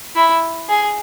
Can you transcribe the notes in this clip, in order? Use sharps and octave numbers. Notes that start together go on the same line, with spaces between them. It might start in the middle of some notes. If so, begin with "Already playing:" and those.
E4
G#4